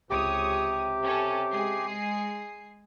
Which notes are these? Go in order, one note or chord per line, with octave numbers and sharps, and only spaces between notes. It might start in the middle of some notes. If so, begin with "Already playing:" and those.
C#2 C3 G4 C#5 D#6
C#4 A4
G#3 G#4 C7